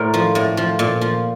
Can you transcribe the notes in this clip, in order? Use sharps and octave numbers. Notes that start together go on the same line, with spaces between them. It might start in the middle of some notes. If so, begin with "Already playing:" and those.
Already playing: A2 A#4 C5 D5
F3
A2
F3
A#2
F3